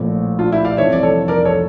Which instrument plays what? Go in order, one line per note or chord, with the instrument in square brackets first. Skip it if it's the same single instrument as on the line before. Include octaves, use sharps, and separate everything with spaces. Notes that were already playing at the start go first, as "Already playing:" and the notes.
Already playing: [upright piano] A#1 A2 F3
[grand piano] D4 F4
E4 G4
D5 F5
[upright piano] F1 F2 E3 G3 [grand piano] C#5 E5
[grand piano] D5
A4 C#5
A#4 D5
A4 C#5